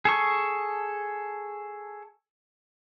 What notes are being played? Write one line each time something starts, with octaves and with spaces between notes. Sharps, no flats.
G#4 A4 C#6